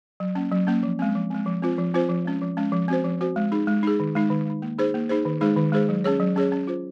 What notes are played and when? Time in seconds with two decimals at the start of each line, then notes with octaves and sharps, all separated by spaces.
0.20 F#3
0.35 A#3 C#4
0.52 F#3
0.67 A#3 C#4
0.83 F3
0.99 G#3 C4
1.15 F3
1.30 G#3 C4
1.46 F3
1.62 C4 F4 C5
1.78 F3
1.94 C4 F4 C5
2.09 F3
2.25 G#3 C#4
2.41 F3
2.57 G#3 C#4
2.72 F3
2.88 C4 F#4 C5
3.04 F3
3.20 C4 F#4 C5
3.36 G#3
3.52 D#4 G#4
3.67 G#3
3.83 D#4 G#4
4.00 D#3
4.15 G#3 D#4
4.30 D#3
4.46 G#3 D#4
4.62 A#3
4.78 D#4 G#4 C5
4.94 A#3
5.09 D#4 G#4 C5
5.25 D#3
5.41 G#3 D#4 G#4 C5
5.57 D#3
5.72 G#3 D#4 G#4 C5
5.89 F#3
6.04 C#4 G#4 C#5
6.20 F#3
6.36 C#4 G#4 C#5
6.52 C#4
6.67 F4 C5